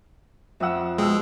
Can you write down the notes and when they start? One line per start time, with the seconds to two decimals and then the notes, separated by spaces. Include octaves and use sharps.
0.60 F2 E5 F#5 E6
0.98 B2 G#3 G5 E6